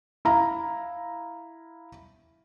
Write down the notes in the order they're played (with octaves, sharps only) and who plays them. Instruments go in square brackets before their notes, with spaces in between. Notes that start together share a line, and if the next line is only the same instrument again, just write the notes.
[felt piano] E4 F5 A#5